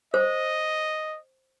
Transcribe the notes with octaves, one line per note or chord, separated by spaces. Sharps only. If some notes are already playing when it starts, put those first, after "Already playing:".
C5 D#5